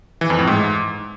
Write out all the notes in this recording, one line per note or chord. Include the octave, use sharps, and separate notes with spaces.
E3
F2
A2
G#2